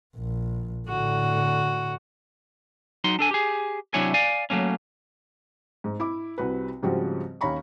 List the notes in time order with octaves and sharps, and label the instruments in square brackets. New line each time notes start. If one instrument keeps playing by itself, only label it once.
[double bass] A#1
[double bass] A2 D3 [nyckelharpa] F#4
[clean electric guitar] F#3 D#4 C6
D4 A4 G#5
G4 G#4
C3 F#3 D4 E4 C#5 G#5
D5 F5 G#5
F#3 A3 A#3 C#4
[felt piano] G#2
E4 D6
C2 C3 F#4 B4
G#2 C#3 F3 G3 C4 F#4
D#2 C#4 F5 A#5 B5 C#6